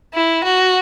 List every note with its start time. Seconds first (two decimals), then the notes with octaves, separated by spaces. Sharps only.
0.14 E4
0.44 F#4